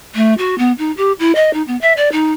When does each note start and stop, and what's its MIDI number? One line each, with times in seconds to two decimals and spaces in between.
0.15 0.34 57
0.38 0.58 66
0.58 0.72 59
0.78 0.92 63
0.97 1.12 67
1.19 1.32 64
1.35 1.53 75
1.54 1.62 63
1.68 1.77 59
1.81 1.93 76
1.97 2.09 74
2.12 2.33 63